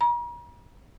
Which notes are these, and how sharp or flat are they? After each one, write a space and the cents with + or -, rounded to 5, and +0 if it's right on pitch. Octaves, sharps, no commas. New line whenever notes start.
A#5 +45